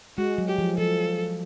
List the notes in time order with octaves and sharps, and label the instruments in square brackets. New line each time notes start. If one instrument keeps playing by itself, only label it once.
[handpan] G#3 [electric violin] F#4
[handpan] F#3
[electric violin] G4
[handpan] F3
[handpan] F3 [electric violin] A4